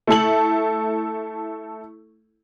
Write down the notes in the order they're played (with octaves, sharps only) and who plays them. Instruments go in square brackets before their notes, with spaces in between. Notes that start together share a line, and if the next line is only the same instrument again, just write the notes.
[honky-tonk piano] A3 E4 A4 F#7